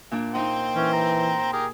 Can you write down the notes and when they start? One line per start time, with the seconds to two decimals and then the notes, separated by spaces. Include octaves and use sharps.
0.11 A#2 D4
0.35 D#4 C5 D#5 G5
0.76 E3 C#4
0.93 A#5
1.53 G4 G#4 A#4